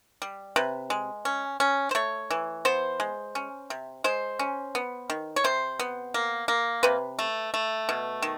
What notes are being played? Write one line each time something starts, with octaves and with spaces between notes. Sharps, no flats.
G3
C3 B4
G#3
C#4
C#4
C5
A3 C#5
E3
B3 C5
G#3
C#4
C3
G#3 C5
C#4
B3
D#3
C#5
C3 C5
B3
A#3
A#3
C3 B4
A3
A3
B2
D#3